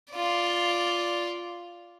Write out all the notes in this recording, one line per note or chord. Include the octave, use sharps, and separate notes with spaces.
F4 D5